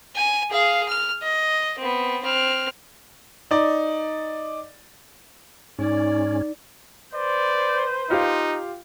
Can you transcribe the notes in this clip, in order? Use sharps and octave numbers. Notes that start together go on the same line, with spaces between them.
G#5
G#4 F5
F6
D#5
B3 C4
C4 F6
D#4 D5
G#2 C#4 D#4 D5
B4 C5 D5
D#4 F4 G4 F5